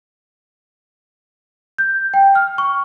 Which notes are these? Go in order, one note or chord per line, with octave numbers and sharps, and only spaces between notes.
G6
G5
F6
C#6